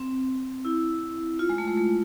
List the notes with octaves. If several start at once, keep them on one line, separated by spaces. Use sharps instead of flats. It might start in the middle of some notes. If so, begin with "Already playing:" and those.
Already playing: C4
E4
F4
G#3
A3
G#3
A3